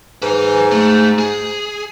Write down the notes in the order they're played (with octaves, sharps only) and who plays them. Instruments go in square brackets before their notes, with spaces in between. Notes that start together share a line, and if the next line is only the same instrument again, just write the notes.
[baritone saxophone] G#2 [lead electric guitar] B4 G#5
[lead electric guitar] A3
G#4